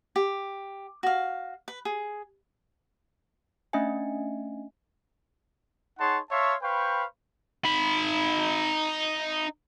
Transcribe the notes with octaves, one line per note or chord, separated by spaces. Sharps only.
G4
F#4 F5
B4
G#4
A3 C#4 D4 D#5 E5 G#5
D#4 G#4 C#5 F#5 A5 C6
C#5 E5 F5 A5 C6 C#6
B4 C5 F5 G5 B5 C#6
D#4 B5